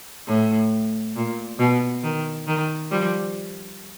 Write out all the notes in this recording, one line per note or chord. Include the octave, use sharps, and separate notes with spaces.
A2
A#2
B2
D#3
D#3
F3 G3